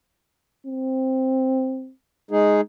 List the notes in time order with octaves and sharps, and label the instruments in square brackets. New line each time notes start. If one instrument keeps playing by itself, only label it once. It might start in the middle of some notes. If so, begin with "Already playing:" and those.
[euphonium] C4
[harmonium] G#3 D#4 G#4